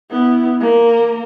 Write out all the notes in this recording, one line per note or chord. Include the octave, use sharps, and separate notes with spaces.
B3 E4
A#3 A#4